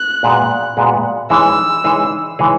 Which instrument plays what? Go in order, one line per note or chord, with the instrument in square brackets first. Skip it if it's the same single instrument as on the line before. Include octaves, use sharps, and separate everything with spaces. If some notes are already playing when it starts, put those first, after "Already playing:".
Already playing: [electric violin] F#6
[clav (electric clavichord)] A#2 G#3 B3 F#4
A#2 G#3 B3 F#4
[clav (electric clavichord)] E3 G#3 D#4 G#4 C#5 [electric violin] E6
[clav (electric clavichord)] E3 G#3 D#4 G#4 C#5
E3 G#3 D#4 G#4 C#5